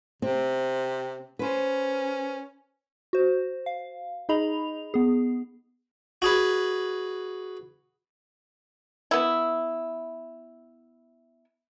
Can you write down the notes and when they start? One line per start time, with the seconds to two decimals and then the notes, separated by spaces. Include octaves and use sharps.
0.22 C3 C4
1.39 C#4 B4 C5
3.13 F#4 C5
3.66 F5
4.29 D#4 G#4 D#5 B5 F7
4.94 B3 G#4
6.22 F#4 G#4 B4
9.11 B3 E4